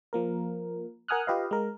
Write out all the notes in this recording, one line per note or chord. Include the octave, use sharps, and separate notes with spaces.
F3 A#3 A#4
A#4 F#5 G#5 D#6 F6 F#6
F4 G4 B4 D#5 F5
G#3 A#4